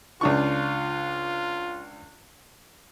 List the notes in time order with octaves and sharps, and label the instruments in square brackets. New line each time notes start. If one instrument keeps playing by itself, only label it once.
[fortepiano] C#2 D4 C#6 [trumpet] F4